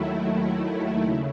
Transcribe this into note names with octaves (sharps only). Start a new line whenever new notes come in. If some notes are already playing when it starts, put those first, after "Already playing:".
Already playing: D#2 D#3 F#3 A3 E4
C#3